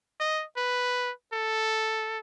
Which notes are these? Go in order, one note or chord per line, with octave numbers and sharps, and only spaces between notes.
D#5
B4
A4